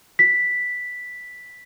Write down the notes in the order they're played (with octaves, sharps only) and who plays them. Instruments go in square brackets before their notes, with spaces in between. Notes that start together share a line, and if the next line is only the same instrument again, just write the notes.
[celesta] B6